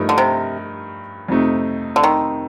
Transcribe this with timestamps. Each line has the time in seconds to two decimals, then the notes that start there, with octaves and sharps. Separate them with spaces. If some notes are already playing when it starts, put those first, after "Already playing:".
Already playing: G2 F3 A3 D#4 A#4
0.09 D3
0.18 C3
1.29 F2 C3 F3 A3 D#4
1.96 D3
2.03 D#3